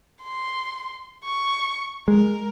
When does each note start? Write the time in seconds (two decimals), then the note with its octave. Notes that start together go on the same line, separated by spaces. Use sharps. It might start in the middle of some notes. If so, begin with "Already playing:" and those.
0.23 C6
1.24 C#6
2.08 G#3 A#4